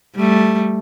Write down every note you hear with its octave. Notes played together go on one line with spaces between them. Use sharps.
G3 A3